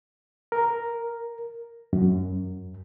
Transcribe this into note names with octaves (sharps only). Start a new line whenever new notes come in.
A#4
F#2